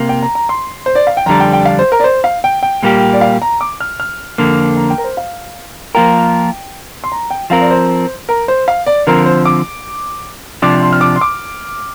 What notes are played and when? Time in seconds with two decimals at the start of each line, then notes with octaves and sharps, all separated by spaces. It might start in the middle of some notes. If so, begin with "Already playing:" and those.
Already playing: C3 A#3
0.09 G5
0.23 A#5
0.35 A#5
0.49 C6
0.86 C5
0.95 D5
1.07 F5
1.17 G5
1.26 F2 D3 G3 D4 A#5
1.40 G5
1.53 G5
1.65 F5
1.79 C5
1.92 A#4
2.00 D5
2.04 C5
2.24 F5
2.44 G5
2.63 G5
2.83 A#2 G3 A#3 G4
3.13 D5
3.21 F5
3.42 A#5
3.61 D6
3.80 F6
4.00 F6
4.38 F2 D3 A#3
4.77 A#5
4.90 G5
4.98 A#4
5.04 C5
5.17 F5
5.95 F3 A#3 F4 A#4 G5
7.04 C6
7.12 A#5
7.30 G5
7.50 F3 C4 A#4 F5
7.61 D5
7.71 C5
8.29 A#4
8.48 C5
8.68 F5
8.86 D5
9.07 D3 F3 C4 A#4
9.26 C5
9.45 D6
10.62 C3 F3 D4 D6
10.83 C6
10.93 F6
11.01 D6
11.16 C6
11.21 D6